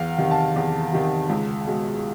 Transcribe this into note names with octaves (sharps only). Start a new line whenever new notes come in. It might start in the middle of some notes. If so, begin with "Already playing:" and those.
Already playing: E2 F5
C3 D#3
A5
E2
C3 D#3
C#2
B2 G#3